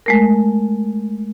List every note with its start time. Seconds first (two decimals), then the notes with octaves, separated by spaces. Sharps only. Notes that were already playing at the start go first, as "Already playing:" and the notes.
0.06 G#3 A3 A#4